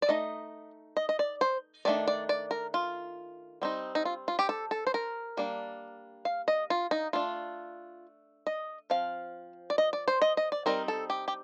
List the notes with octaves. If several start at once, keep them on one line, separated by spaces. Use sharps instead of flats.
D5
A3 D#4 D#5
D#5
D#5
D5
C5
D#3 A3 D4 D5
D5
D5
A#4
F4
G3 C4 D#4
D#4
F4
F4
G4
A4
A4
C5
A#4
G3 A#3 D4
F5
D#5
F4
D#4
A3 D4 F4
D#5
F3 C4 F5
D5
D#5
D5
C5
D#5
D#5
D5
G3 C4 D#4 A#4
A4
G4
G4